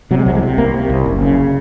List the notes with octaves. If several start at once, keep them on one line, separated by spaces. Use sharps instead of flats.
C3 F#3
G#3
C2 F#3
G#3
C3
C2 A#3
C3
C2
F#1
C#3